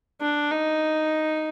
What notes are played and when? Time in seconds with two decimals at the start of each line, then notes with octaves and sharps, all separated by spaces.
0.21 D4
0.51 D#4